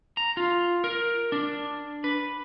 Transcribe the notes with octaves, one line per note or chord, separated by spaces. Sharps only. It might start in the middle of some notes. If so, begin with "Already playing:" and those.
A#5
F4
A#4
D4
B4